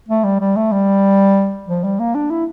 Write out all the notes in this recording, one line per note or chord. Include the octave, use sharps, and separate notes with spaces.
A3
G3
G3
A3
G3
F3
G3
A#3
D4
E4